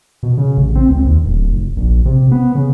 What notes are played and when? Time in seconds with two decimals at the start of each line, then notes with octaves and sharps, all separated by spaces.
0.23 B2
0.38 C#3
0.57 A1
0.75 C4
0.89 C#2
1.06 D#2
1.26 D1
1.48 F1
1.77 A#1
2.05 C3
2.31 B3
2.55 C#3